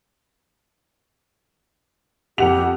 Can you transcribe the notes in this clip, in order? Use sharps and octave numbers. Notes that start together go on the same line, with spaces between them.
F2 G4 F#5 F7